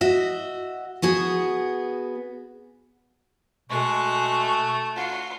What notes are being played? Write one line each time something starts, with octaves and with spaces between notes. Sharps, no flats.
F#4 D#5 E5
B3 F#4 G#4
B2 G#3 A3 C#6 F#6
F4 F#4